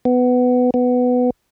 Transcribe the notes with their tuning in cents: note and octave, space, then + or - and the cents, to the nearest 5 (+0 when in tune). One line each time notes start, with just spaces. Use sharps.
B3 +15
B3 +10